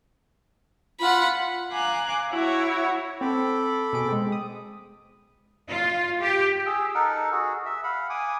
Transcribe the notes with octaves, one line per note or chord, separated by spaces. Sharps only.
F4 F#5 B5
F5 G#5 A#5 D6 F#6
E4 F#4 C#5
C4 A4 B5 D6
B2 G#4 D7
G#3 C4
D#6
F4
G4
G#4 E6
D#4 A4 A#4 F#5
F#4 G#4
E5
F5 F#5 B5
G#5 D6 D#6